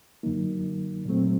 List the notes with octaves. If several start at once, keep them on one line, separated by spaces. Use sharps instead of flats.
F#2 D3 F#3 A#3 D#4
A#2 F#3 A3 C4